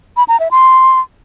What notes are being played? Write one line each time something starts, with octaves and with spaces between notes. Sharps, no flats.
B5
A#5
E5
C6